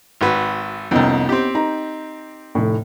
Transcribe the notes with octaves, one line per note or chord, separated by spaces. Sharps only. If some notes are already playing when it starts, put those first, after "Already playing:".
G#1 F#4 B4
C2 F2 B3 C#4 D#4
C4 G4
D#4 A#5
F1 A2